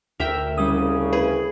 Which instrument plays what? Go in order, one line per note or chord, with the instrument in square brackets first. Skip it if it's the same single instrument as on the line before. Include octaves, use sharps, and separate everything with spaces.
[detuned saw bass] D2 [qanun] A#4 E5 G5
[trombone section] C2 C#3 [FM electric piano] G3 C#4 D#6
[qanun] G#4 [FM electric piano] B4